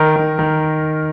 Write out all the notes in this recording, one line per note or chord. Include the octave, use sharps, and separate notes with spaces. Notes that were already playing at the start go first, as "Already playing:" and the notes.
Already playing: D#3 A#4
D#3
D#3